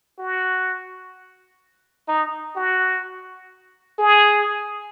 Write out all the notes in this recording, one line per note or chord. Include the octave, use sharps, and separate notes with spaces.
F#4
D#4
F#4
G#4